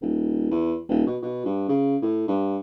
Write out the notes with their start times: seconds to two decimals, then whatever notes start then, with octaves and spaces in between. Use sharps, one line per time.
0.01 D#1
0.51 E2
0.89 D#1
1.07 B2
1.23 B2
1.45 G2
1.69 C#3
2.02 A2
2.28 G2